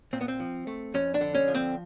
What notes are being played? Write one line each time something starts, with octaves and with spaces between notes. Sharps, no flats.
A#2 C4
B3
C4
F3
A3
F2 C#4
D4
D3
C#4
F3
C4